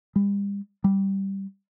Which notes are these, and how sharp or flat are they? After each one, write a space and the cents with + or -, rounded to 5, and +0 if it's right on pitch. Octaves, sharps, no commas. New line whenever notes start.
G3 +40
G3 -5